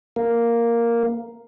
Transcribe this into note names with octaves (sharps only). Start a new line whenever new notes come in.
A#3